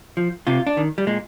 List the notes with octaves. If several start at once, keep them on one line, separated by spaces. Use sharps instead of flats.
F3
C3 F4
D4
D#3
G3
A#2 G#3